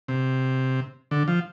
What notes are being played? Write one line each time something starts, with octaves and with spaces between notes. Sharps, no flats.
C3
D3
F3